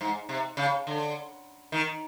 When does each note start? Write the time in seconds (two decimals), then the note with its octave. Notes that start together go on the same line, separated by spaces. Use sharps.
0.01 G#2
0.29 C3
0.57 C#3
0.87 D3
1.72 D#3